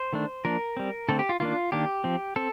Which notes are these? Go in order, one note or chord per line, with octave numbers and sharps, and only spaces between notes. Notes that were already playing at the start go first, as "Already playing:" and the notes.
Already playing: C5
D#3 A3 D4
F3 A#3 D4 A#4
G3 C4
D3 A3 C4 A4
G4
F4
D#3 A#3 D4 F4
D#3 A#3 D4 G4
F3 C4
C4 A4